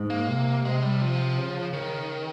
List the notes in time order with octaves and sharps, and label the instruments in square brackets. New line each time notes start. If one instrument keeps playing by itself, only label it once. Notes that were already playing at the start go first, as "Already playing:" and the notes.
Already playing: [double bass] G#2
[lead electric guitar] A#3
[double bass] C3
[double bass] C3 [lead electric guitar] G#3
[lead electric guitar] G3
F3
[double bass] C#3
[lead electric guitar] D#3